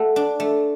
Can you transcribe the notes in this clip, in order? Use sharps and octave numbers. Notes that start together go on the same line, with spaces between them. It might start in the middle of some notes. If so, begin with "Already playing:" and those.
Already playing: A3 F#4
D4
A3